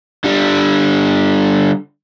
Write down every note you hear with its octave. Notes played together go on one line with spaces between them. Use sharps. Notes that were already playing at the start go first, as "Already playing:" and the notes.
D3 G3